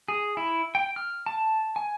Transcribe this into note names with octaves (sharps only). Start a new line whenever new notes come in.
G#4
E4
G5
F6
A5
G#5